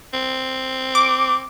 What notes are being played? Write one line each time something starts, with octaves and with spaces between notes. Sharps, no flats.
C4
D6